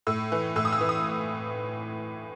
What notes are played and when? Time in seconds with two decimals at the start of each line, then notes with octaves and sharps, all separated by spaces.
0.07 A2 E6
0.32 E3
0.56 A2 E6
0.65 D#6
0.72 E6
0.81 E3
0.89 D#6